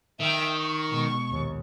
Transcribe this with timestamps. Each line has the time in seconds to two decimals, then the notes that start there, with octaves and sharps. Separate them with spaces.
0.20 D#3 E5 G5
0.56 C#6
0.89 B2 G#3
1.29 A#1 D#2